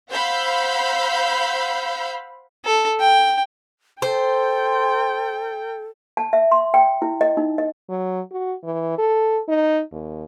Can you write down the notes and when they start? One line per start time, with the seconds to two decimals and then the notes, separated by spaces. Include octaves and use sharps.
0.11 C5 F5 F#5 B5 E6 G6
2.65 A4
3.00 G5
4.02 A4 C5 G5
6.17 A5
6.33 E5
6.52 C6
6.74 G5
7.02 E4
7.21 D#5
7.37 D#4
7.58 D#5
7.89 F#3
8.31 F#4
8.64 E3
8.98 A4
9.48 D#4
9.92 D#2